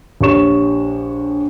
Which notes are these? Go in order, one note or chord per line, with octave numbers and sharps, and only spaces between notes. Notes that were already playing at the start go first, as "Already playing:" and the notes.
A#1 G4 C#5 C#6 E7